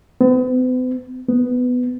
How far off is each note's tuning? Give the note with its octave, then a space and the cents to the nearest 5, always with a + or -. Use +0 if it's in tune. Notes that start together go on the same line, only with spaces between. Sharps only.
B3 +45
B3 +10